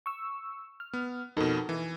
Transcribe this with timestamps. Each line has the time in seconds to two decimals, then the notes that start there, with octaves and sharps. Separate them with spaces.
0.06 C#6 E6
0.80 F6
0.93 B3
1.37 F2 B2 D#4 A4 A#4
1.69 E3